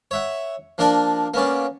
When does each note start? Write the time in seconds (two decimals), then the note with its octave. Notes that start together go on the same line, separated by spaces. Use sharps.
0.11 C#5 E5 F#5
0.78 F3 A#3 D4 A#4 D5
1.34 A#3 B3 C#4 D5